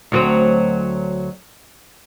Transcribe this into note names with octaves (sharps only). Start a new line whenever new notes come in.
D2 F#3 C4